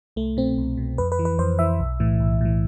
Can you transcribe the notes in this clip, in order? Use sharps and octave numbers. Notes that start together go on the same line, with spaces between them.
C2 A3
B2 C4
C2
B2
F2 B4
B4
E3
B4
F2 C5
E3 E5
B1
A2 E3
B1
A2 E3